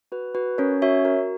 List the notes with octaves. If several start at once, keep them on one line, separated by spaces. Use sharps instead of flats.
F#4 B4
F#4 B4
C#4 A#4 C#5
F#4 C#5 E5
F#4 A#4